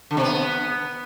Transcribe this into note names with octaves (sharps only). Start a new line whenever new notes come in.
D3
C3
B3